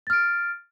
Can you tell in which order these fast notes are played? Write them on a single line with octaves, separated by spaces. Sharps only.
A6 F6 D7